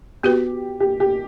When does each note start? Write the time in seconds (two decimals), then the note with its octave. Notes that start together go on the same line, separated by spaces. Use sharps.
0.23 B3 F#4 G4 B4
0.80 G4
1.00 G4